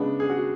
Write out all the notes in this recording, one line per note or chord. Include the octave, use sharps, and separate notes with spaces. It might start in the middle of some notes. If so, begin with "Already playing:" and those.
Already playing: C#3 G#3 B3 D4
G#4
F#4